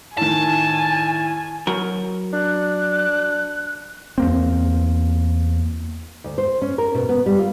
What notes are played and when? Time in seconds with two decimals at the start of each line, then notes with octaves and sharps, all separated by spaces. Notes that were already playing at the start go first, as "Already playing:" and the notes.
0.17 A2 D#3 G#5 A5
1.67 F#3 A#4
2.33 D4 F#6
4.18 E2 A#3 C4
6.24 D2
6.38 C5
6.62 C#4
6.78 A#4
6.95 B2
7.09 B3
7.26 G3
7.39 F4